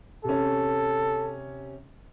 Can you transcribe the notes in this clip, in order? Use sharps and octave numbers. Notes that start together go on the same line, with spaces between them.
C3 C#4 A4